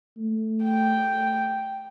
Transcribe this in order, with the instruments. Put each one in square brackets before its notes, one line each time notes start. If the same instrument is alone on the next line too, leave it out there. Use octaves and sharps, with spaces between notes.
[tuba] A3
[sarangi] G5